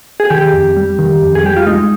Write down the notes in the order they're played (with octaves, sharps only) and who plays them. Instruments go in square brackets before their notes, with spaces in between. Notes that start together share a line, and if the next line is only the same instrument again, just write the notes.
[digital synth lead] G#4
[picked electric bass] D#3 [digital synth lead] G4
[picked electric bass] F2
G3
D#3
F2
[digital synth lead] G#4
[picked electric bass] G3 [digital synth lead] G4
[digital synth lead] F4
[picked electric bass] G#3 [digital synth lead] D#4